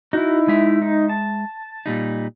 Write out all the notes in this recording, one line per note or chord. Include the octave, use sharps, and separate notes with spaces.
D#4 E4 F#4
G#3 E5
D#4
A5
A#2 G3 D#4